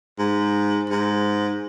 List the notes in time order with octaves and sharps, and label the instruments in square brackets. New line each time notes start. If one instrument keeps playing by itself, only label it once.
[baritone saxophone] G#2
G#2